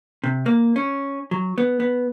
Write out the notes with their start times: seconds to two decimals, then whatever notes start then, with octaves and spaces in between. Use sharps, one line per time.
0.24 C3
0.46 A#3
0.76 C#4
1.31 F#3
1.58 B3
1.80 B3